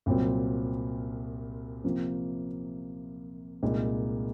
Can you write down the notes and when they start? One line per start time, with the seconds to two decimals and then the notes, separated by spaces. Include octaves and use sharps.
0.06 C2 A#2 F#3 C4
1.84 C3 F3 A#3
3.63 C2 A#2 G#3 D#4